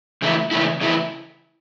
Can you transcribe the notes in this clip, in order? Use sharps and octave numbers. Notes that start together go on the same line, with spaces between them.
C#3 E3 A3 E4
C#3 E3 A3 E4
C#3 E3 A3 E4